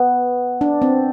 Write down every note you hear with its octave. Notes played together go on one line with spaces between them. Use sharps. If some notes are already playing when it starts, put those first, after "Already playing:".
Already playing: B3
D4
C4